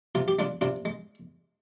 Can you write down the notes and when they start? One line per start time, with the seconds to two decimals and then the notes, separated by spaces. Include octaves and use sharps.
0.15 C3 F4
0.28 G4
0.39 G#3 D4 F4
0.61 C3 D4 F4
0.85 G#3